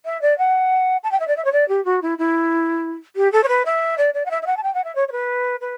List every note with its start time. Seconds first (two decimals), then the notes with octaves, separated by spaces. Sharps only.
0.05 E5
0.21 D5
0.38 F#5
1.03 A5
1.11 G5
1.20 E5
1.27 D5
1.37 E5
1.44 C#5
1.52 D5
1.68 G4
1.85 F#4
2.02 E4
2.18 E4
3.16 G4
3.32 A4
3.43 C#5
3.48 B4
3.65 E5
3.98 D5
4.14 D5
4.25 F#5
4.31 E5
4.42 E5
4.46 F#5
4.57 A5
4.63 G5
4.74 F#5
4.84 E5
4.95 C#5
5.08 C#5
5.12 B4
5.61 B4